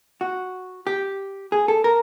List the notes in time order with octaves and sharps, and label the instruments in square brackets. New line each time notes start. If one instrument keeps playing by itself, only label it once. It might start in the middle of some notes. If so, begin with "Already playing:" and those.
[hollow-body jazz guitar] F#4
G4
G#4
A4
A#4